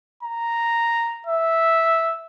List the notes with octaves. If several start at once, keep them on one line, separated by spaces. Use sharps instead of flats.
A#5
E5